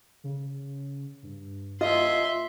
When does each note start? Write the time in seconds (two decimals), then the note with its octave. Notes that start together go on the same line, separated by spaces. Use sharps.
0.24 C#3
1.23 G2
1.81 D#2 F4 D#5 E5 C6